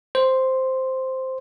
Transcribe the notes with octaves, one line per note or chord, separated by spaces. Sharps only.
C5